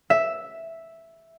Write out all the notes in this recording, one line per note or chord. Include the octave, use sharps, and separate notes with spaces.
E5